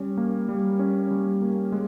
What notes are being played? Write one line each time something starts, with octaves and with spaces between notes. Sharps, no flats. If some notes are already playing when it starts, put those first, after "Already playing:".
Already playing: G3 C#4
A#3
G3
C#4
G3
A#3
G#3